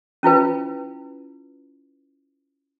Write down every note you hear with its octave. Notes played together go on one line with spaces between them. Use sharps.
C#4 E4 F4 B4